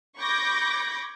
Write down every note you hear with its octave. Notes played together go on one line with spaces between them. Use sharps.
B5 C#6 D6 G6 G#6 A#6